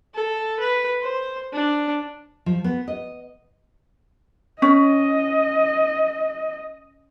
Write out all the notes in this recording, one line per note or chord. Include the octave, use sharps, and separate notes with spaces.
A4
B4
C5
D4
F3
B3
D#5
C#4 D#5